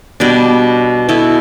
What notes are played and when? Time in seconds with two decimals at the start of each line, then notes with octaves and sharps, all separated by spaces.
0.20 B2 G3 D4
1.09 B2 B3 E4 A4